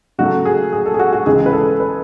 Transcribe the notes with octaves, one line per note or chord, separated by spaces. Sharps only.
C#3 F#3 A3 F#4
G#4
G#4
A4
G#4
F#4
F#4
C#2 C#3 E3 G#3 G#4
B4
A4
B4